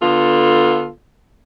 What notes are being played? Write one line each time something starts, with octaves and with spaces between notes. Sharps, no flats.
D3 B3 F4 A4